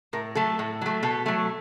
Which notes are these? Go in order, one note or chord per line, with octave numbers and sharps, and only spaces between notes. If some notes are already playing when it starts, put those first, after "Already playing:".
A2 A#4
F#3 A3 A4
A2
F#3 A3
B2 A4
F#3 A3